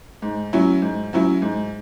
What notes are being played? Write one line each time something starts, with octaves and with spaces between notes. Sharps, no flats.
G#2
F#3 C#4 E4
G#2
F#3 C#4 E4
G#2